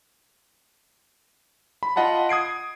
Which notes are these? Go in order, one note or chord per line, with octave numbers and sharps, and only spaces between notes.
B5
F4 D#5 F#5 A5 B5
D#6 G#6 C7 D7